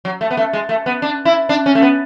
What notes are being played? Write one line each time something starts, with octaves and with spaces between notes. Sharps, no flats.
F#3
A3
B3
A3
G#3
A3
B3
D4
E4
D4
C#4
A3
B3